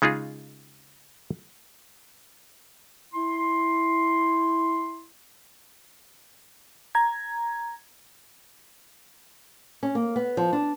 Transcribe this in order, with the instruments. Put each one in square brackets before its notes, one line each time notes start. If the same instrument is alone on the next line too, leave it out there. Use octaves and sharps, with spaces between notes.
[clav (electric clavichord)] C#3 G#3 D#4 F4 G#4
[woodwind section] E4 C6
[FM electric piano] A#5 G#6
[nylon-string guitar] C#4
A#3
B3
F3
D4